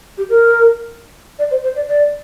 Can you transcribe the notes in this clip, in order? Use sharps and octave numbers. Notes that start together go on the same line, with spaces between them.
G4
A#4
D5
C5
C5
D5
D5